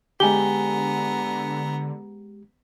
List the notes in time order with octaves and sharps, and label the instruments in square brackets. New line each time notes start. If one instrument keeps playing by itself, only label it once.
[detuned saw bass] D3 [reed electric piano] G#3 G4 [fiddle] B3 A#5 [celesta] G#5 G7